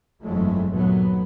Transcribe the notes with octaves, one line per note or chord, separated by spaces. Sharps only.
G1 F2 E3 F#3 G#3 A3
D#2 A#2 F#3 A3 B3